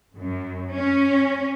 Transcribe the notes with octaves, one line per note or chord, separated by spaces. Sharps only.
F#2
C#4